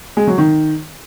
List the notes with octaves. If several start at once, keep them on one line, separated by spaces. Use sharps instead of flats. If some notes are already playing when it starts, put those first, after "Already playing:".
G#3
F#3
D#3